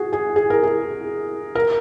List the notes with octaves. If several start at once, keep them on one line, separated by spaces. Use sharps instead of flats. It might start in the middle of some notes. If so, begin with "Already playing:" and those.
Already playing: F#4 G#4
G#4
G#4
A#4
G#4
A#4